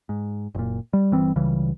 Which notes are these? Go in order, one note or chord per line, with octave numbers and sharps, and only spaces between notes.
G#2
F#1 A#2
G3
G1 E3 G3 C4
C#2 C#3 E3 G3